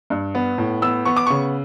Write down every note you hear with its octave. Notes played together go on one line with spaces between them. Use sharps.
G2
B3
A2
B3 E6
B3 C#6
D6
C#3 C#6